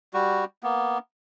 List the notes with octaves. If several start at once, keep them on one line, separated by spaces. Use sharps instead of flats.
G3 F#4
A#3 B3